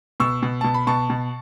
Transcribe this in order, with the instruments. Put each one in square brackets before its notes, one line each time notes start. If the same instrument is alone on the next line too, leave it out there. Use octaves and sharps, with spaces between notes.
[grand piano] B2 C#6 E6
B2
B2 A5
B5
B2 A5 C#6
B2